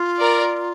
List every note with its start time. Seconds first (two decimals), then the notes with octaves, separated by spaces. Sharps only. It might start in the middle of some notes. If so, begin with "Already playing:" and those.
Already playing: F4
0.20 A#4 D5